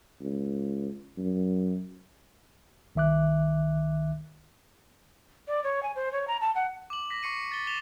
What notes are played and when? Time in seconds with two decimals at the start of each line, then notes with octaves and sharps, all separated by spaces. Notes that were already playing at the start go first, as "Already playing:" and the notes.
0.21 C#2
1.17 F#2
2.95 C2 D#3 E5 D6 F#6
5.47 D5
5.64 C#5
5.83 G#5
5.96 C5
6.13 C#5
6.28 A#5
6.41 A5
6.55 F#5
6.90 D6 F#7
7.10 A#6 B6
7.23 C#6 C7 C#7 D#7
7.52 A6 G7
7.67 A6 B6 E7 F7 G7